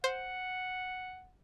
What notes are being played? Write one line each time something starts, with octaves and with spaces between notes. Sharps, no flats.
C5 F#5